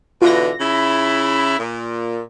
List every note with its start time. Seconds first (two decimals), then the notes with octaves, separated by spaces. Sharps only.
0.22 B2 D3 E3 F4 A#6
0.59 C#3 E4
1.58 A#2